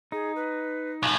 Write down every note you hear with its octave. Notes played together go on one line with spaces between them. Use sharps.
D#4 G#4
B4
B1 A2 G#5